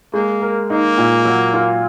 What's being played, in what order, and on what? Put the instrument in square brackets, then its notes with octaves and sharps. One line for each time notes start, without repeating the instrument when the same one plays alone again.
[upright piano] G#3 [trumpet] A#3
[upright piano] A#4
[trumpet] A#3 [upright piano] D#4
[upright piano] A#2
F#3
F4